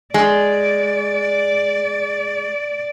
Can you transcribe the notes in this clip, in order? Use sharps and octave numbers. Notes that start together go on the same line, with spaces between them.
G#3 D5